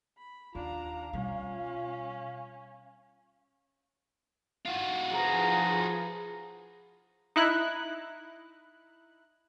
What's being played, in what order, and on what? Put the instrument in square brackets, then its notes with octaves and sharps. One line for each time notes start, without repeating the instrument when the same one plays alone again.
[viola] B5
[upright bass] D#2 [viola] D4 A#5 [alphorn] F4 [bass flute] F5
[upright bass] B2 G3 [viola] C#4
[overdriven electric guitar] F4 F#4
[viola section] F3 G#4 B4 [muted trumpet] A#5
[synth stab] D#4 E4 F#6